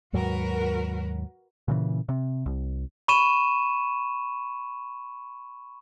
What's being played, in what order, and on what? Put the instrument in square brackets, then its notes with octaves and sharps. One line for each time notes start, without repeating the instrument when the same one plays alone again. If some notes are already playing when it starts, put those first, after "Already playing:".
[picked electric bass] D#2 G#2 F#3 [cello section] F#4 A#4 B4
[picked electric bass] A#2 C#3 E3
C3
C2
[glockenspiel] B5 C#6 D#7 E7